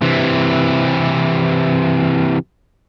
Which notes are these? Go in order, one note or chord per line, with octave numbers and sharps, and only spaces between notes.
C3 E3